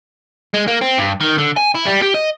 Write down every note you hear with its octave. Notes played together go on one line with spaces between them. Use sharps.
G#3
A#3
C4
G2
D#3
D3
G#5
E4
G3
G4
D#5